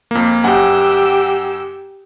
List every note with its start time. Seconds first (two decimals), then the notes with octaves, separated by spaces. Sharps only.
0.11 F2 A#3
0.44 F#2 G4 F#5 G#5 E6